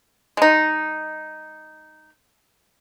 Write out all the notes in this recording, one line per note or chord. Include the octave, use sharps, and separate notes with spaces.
G#3 D#4